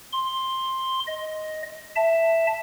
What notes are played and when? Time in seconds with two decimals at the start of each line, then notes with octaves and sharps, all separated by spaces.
0.13 C6
1.07 D#5
1.96 E5 A5